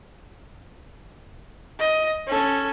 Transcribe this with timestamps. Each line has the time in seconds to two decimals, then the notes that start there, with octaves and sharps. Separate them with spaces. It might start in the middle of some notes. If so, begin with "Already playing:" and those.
1.79 D#5
2.27 C#4 A4